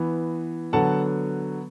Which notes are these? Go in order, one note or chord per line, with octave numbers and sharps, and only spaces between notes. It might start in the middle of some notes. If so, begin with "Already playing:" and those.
Already playing: E3 B3
D3 F#3 B3 F#5 A5